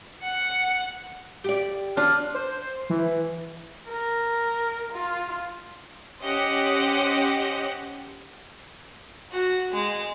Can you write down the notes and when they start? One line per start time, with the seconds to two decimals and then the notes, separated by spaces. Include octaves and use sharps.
0.23 F#5 C#7
1.44 G4 D5
1.97 D4 F4
2.35 C5
2.90 E3
3.89 A#4
4.93 F4
6.22 C#4 G4 C5 D#5 F#5
9.32 F#4
9.72 G#3